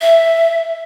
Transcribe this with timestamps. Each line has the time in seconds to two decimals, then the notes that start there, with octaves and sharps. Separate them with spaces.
0.01 E5